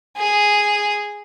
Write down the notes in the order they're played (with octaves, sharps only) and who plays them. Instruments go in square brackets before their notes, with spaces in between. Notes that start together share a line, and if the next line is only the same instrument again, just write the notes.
[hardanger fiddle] G#4